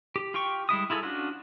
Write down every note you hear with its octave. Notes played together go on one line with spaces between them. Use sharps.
G4
F4 G4 G5 C#6
G3 G#3 E4 D#6
E4 F4 G#4 A4
C#4 D4 F4 F#4